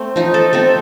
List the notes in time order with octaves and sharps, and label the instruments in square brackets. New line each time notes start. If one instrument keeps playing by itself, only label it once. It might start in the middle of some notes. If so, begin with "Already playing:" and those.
Already playing: [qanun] A3 C4
F3 D#4
A4
A3 C4 A4